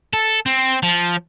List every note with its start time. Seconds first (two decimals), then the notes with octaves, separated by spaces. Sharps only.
0.13 A4
0.46 C4
0.83 F3